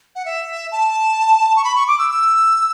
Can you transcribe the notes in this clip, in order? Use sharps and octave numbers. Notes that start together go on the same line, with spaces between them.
F#5
E5
A5
C#6
B5
C#6
D6
E6
E6